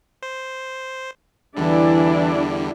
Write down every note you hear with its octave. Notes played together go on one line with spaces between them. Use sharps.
C5
E2 D3 E3 G3 D4 E4 D5